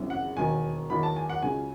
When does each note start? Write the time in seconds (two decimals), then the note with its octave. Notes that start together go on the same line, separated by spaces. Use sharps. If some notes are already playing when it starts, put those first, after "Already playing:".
Already playing: G#1 F#2 C#3 E3
0.10 F#5
0.36 E1 D#2 D#3 F#3 G#5
0.90 E2 D#3 F#3 B5
1.03 A5
1.16 G#5
1.29 F#5
1.42 C#2 C#3 F#3 G#5